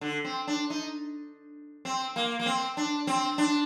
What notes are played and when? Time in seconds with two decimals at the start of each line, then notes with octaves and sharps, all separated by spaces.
0.01 D3
0.25 C4
0.47 D4
0.70 D#4
1.85 C4
2.16 A#3
2.40 A#3
2.46 C4
2.77 D4
3.07 C4
3.38 D4